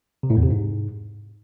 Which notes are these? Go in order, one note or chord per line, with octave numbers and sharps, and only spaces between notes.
C3
A2
E2
C3
G#2